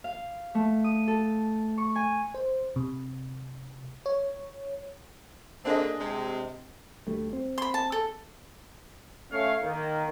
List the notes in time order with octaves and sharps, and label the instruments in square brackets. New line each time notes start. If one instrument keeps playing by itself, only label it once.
[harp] F5
A3
D#6
A4
C#6
G#5
[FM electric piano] C5
C3
C#5
[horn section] D3 A#3 C4 [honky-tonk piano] D4 G#4 D#5
[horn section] C3 G#3
[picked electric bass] D2 G3 A3
C4
[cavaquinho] B5 C6
A5
A4
[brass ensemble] A3 C#4 C#5 F5
D#3 A#3